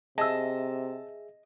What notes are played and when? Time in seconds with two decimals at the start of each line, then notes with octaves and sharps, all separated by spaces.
0.18 C3 G#4 D#5 E5 A5 E6